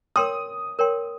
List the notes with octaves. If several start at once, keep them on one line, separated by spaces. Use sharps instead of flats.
A#4 C#5 G5 C6 D#6
A#4 C#5 G5 C6